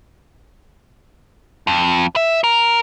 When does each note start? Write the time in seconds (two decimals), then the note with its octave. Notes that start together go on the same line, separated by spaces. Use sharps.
1.67 F2
2.16 E5
2.44 A#4